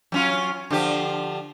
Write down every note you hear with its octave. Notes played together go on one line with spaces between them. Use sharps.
F#3 C#4 F4
D3 F3 G4